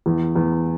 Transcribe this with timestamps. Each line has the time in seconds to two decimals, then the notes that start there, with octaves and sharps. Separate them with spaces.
0.06 E2
0.35 E2